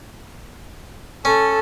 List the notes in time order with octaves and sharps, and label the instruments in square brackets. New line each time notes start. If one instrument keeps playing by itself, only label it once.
[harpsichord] C#4 [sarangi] A4